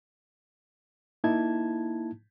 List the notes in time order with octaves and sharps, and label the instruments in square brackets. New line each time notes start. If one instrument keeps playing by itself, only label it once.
[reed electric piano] A#3 D#4 E4 A5 G#6